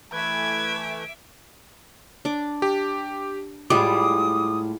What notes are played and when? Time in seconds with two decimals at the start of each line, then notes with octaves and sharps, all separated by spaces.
0.13 E3 A3 B4 E5 D6 G#6
2.25 D4 D6
2.62 G4
3.70 A2 G3 G#3 F4 D6 D#6